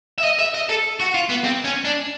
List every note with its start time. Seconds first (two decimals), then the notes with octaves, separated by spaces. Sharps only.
0.18 E5
0.24 D#5
0.39 E5
0.54 D#5
0.69 A4
1.00 F#4
1.14 F4
1.29 B3
1.44 C4
1.64 C#4
1.85 D4